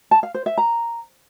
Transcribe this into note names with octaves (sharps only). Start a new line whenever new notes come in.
A5
F5
C5
E5
A#5